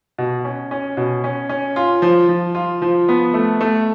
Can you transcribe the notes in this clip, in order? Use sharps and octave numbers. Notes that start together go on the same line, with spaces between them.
B2
C#4
C#4
B2
C#4
C#4
F4
F3
F3
F4
F3
B3
A3
A3